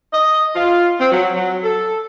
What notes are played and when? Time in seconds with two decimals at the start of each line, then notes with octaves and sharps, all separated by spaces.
0.13 D#5
0.56 F4
0.99 C4
1.12 F#3
1.35 F#3
1.63 A4